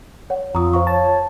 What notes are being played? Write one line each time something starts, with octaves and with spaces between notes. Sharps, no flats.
C#5 F#5
F2 F4 A#5 D#6
C5 F5 C#6
C#5 A5